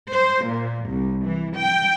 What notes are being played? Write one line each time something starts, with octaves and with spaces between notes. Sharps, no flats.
C5
A#2
C2
E3
G5